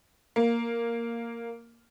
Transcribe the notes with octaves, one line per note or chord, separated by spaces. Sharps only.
A#3